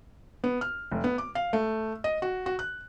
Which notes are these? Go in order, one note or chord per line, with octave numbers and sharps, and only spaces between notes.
B3
F6
F1
B3
D6
F5
A3
D#5
F#4
F#4
F#6